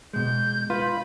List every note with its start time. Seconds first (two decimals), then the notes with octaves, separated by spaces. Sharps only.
0.13 B2 G#3 G6
0.70 F4 B4 B5